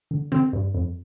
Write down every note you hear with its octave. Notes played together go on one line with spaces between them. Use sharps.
D3
D3 C4
G2
F2